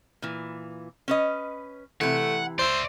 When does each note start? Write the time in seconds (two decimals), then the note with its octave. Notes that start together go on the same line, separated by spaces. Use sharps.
0.22 A#2 E3
1.08 C#4 B4 D#5
2.01 C3 E3 A3 F#5
2.59 C5 D5 E5